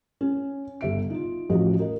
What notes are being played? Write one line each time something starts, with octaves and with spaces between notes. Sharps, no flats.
C#4
G1 E5 D7
D#4 F4
A1 F3 F#4 D#5
A#4 D#5